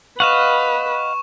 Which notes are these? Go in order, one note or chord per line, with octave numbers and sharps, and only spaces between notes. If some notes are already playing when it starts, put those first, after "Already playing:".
B4 D#5 F5 F#5 C#6 E7